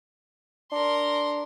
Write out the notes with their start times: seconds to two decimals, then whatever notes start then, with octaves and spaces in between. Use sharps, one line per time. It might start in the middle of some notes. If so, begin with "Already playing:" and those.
0.72 D4 A#4 C6